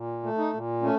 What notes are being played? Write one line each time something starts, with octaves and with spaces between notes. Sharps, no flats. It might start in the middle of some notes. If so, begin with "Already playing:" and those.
Already playing: A#2
A3
D#4
A#2
A3 C#4